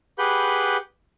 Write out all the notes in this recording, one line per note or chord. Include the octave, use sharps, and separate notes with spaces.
G4 G#4 B4 F#5 B5 G6